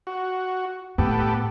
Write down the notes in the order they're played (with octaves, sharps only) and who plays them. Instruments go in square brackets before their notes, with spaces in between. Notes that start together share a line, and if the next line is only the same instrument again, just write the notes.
[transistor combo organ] F#4
[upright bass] A2 [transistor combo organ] B3 G4 A4